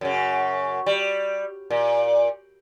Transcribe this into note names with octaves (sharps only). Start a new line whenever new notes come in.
F#2 C#3
G3
A#2